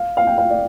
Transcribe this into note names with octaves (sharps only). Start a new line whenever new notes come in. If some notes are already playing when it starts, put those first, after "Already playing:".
Already playing: F5
F5
G5
F5
D5